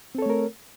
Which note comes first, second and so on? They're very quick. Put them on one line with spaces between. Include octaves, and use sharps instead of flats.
C4 A4 C#5 A3 A#4